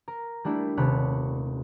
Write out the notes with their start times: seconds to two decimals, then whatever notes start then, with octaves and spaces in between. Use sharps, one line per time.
0.08 A#4
0.45 G3 A3 D4 E4
0.77 D#1 C3 A3 C#5 B5 F#6